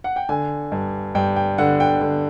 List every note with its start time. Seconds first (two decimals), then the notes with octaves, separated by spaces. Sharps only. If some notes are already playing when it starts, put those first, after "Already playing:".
0.04 F#5
0.16 G5
0.29 D3 G#5
0.72 G2
1.15 G2 G5
1.36 G5
1.58 D3 F#5
1.80 G5
2.01 D3